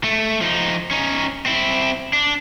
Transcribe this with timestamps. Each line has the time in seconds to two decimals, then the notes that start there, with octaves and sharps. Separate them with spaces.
0.04 A3
0.41 F3 D#4
0.91 C#4 D#4
1.46 C4 E4
2.13 D4